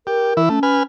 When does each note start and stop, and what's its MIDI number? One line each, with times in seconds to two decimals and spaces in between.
0.07 0.34 67
0.07 0.41 70
0.37 0.49 52
0.37 0.49 64
0.49 0.59 57
0.49 0.82 61
0.63 0.83 71
0.63 0.83 80
0.63 0.83 89